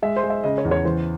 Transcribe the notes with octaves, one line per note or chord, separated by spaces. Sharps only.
G#3 E5
C5
G#3
E5
C#3 D#5
C#5
E2
C#5
E3 C5